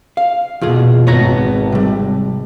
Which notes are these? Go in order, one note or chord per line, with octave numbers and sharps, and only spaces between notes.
F5
E2 B2 F4 G#4
G#1 B3 C#5 A#5
C3 G3